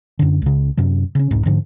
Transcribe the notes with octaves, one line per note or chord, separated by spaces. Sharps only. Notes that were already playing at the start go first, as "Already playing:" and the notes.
F#2 D3
C#2 C#3
F#2 C3 F#3
C#3 C#4
E1 C2 G#2
G#2 D3 F3